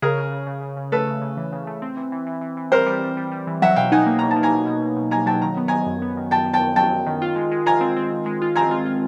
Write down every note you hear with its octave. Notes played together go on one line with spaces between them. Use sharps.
C#3 G#4 A#4
C#3
C#3
C#3
C#3
C#3
A3 A4 B4
C#3
C#3
E3
C#3
A3
C4
E3
E3
E3
E3
E3
G3 A#4 C5
G3
G3
G3
G3
E3
F#3 E5 F#5
B2 F5 G5
D#4 F#5 G#5
A#3
B2 A#5
A5
A#3
G#5 A#5
B2
B2
B2
B2
A#3 G#5 A#5
F#3 G5 A5
D#3 A#5
B3
D#3 G#5 A#5
F#2
B3
D#3
F#2 G5 A5
F#2
G5 A5
F#2
F#3 G5 A5
F#2
D#3
F4
G#3
G#3
F4 G#5 A#5
C4
C4
C4
G#3
F4
C4 G#5 A#5
F4
F4